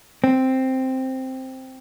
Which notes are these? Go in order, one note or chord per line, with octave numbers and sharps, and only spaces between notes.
C4